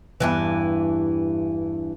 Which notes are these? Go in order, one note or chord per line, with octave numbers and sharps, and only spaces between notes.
E2 G2 E3